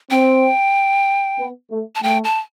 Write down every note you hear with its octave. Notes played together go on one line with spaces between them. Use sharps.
C4 G5
B3
A3
A5
A3 G5
A5